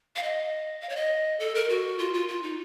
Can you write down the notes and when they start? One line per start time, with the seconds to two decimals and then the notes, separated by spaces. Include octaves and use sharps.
0.16 F5
0.23 D#5
0.81 F5
0.89 C#5
0.96 D#5
1.40 A4
1.55 A#4
1.69 F#4
1.99 F4
2.14 F4
2.28 F4
2.43 D#4